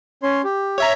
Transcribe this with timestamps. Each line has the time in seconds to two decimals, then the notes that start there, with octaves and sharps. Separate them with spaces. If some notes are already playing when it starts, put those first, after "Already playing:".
0.23 C#4 C#5 C6
0.44 G4
0.78 C#5 E5 A#5